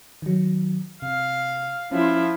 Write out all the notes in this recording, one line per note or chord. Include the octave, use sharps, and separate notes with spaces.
D#3 F#3
C3 F5
F3 C#4 E4 F4